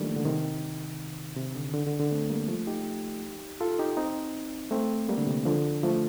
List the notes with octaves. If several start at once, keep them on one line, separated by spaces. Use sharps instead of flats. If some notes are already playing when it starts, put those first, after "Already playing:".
Already playing: D#3 F3 G3 A3 A#3 D4
D3
C3 D#3
C3
D3
D3
D3
D3
A3 C4
G3 A#3
F3 A3
D#4 G4
F4 A4
D#4 G4
C4 D#4
A3 C4
G3 A#3
D3
C3
D3 F3
F3 A3